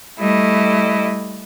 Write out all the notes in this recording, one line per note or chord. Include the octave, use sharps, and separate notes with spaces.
G3 A3 E4 D#5